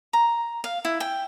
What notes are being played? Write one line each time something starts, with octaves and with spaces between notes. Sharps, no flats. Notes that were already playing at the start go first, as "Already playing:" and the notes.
A#5
F5
E4
G5